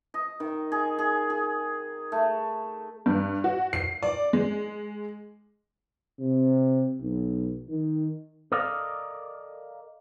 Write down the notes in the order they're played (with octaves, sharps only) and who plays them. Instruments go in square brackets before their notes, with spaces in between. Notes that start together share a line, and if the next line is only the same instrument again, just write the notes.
[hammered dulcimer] D#5
D#3
G#4
G#4
G#4
A3
[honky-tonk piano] G2
F#4
C7
D5
G#3
[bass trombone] C3
B1
D#3
[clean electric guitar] A4 A#4 D5 D#5 F5